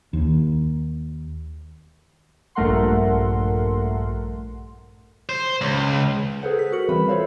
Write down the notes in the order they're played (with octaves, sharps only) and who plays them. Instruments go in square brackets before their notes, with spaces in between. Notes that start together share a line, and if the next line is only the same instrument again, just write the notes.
[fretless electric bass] D#2
[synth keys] A#1 G2 A3 A#4 F#5 C6
[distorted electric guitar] C5
C#2
[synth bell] G#4 A4 B4 C5 F#5
B6
F#4 A#4 C#7 F#7
E3 G3 C4 B4 E5 B5
F4 A4 C5 C#5 F5